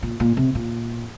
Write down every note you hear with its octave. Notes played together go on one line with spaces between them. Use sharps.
A#2
A#2
C3
A#2